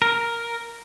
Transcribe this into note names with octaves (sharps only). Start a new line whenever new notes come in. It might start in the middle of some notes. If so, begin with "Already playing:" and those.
A#4